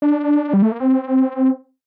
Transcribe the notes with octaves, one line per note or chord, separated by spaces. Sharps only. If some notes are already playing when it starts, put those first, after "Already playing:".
D4
G3
A3
A#3
C4